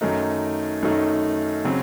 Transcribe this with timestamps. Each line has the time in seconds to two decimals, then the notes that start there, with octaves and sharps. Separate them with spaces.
0.01 F#2 D#3 A3 D#4
0.83 F#2 D#3 A3 D#4
1.64 C#3 F#3 C4